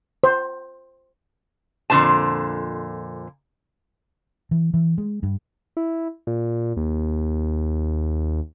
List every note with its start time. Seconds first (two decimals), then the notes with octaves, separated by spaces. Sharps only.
0.24 C5
1.90 F2 A#2 D3 C5 A5
4.51 E3
4.74 E3
4.98 G#3
5.23 G2
5.77 E4
6.27 A#2
6.77 D#2